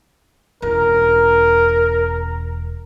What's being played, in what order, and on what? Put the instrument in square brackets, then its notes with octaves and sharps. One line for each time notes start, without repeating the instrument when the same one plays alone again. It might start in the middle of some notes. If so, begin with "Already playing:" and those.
[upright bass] E1 C#4 [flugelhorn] A#4